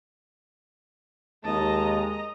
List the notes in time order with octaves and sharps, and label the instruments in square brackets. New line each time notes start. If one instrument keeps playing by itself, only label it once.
[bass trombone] D#2 [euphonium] G#3 [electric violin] D#5 A#5 [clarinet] A5